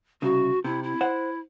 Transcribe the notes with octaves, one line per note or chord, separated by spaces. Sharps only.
C2 C#3 F#4
C3 E4
E4
C5 F#5